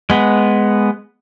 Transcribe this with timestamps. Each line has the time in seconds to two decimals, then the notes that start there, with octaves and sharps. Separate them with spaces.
0.10 G#3 B3